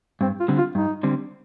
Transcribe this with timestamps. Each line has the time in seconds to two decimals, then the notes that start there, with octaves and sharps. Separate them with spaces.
0.21 G2 C4
0.40 F4
0.48 D3 G3 C4
0.58 F4
0.75 G2 D#4
1.03 D3 G3 C4